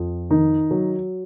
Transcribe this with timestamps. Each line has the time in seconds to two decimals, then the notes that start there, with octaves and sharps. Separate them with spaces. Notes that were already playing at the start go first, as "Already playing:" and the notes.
Already playing: F2
0.30 D#3 D#4
0.71 F#3